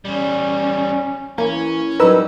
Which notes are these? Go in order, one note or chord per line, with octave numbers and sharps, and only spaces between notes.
E2 G3 C#4
E3 A#3 C#4
F#3 G3 D#4 A#4 B4 E6